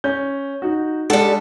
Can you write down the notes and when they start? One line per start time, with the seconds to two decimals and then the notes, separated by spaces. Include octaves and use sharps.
0.04 C#4 G6
0.62 D#4 F#4
1.10 G3 G#3 D4 A4 F#5